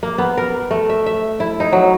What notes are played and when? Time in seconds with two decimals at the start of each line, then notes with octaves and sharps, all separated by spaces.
0.03 A#3
0.18 B3
0.37 A#4
0.71 A3
0.90 E5
1.06 E5
1.40 E4
1.60 D#4
1.73 F#3